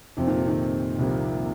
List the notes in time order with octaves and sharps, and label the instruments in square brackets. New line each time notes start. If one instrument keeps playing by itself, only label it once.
[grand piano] F1 F2 F3 C4 [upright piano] C3
[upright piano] A#2
C3
A#2 D#3
[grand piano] C2 C3 F3 A#3